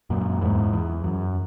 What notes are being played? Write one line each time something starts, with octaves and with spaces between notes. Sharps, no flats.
F#2 A#2
E2 G#2
E2
F#2